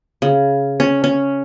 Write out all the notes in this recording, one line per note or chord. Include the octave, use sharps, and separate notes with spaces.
C#3
C#4
C#4